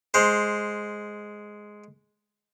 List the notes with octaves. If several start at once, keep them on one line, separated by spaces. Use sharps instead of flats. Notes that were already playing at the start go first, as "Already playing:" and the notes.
G#3 C5